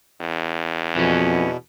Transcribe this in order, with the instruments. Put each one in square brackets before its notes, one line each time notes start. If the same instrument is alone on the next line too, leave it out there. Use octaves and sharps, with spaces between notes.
[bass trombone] E2
[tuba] F2 [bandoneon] B2 [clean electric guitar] E3 C#4